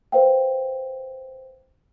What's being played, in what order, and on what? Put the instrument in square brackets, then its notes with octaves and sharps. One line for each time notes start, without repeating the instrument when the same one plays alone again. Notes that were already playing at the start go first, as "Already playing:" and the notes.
[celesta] B4 C5 F5 G5